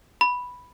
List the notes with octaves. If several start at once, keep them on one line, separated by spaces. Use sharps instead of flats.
B5